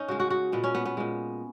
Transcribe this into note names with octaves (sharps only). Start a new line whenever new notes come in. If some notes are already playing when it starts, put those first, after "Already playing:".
Already playing: C#4 D#4
C#3 G#3 F#4
F#4
F#4
A#2 G#3 B3
C#4
B3
B3
A#2 G#3